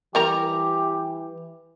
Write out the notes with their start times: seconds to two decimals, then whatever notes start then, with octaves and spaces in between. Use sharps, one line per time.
0.15 E3 G3 G4 A#4 A#5